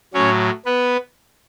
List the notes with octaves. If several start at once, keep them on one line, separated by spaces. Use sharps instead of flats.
A2 F#3 C#4 C#5
B3 B4